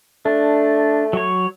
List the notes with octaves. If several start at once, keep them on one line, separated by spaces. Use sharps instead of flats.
A3 D4
F#3 C#5